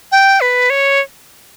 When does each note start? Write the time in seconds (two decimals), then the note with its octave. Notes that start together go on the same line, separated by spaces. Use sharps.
0.12 G5
0.41 B4
0.70 C#5